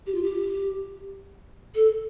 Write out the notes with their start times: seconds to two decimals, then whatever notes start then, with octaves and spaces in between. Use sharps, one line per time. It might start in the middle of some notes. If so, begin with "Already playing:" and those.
0.07 G4
0.15 F4
0.23 G4
1.75 A4